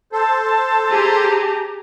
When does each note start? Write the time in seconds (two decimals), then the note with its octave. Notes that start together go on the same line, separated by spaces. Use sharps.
0.12 A4 C5 A5
0.91 G4 G#4 A#5